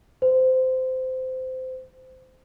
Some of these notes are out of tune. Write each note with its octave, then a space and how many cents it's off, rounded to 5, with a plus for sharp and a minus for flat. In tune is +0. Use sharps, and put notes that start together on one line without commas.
C5 -20